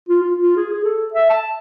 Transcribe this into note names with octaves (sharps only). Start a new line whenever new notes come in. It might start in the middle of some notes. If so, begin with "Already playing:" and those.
F4
F4
F4
G#4
G#4
A4
E5
A5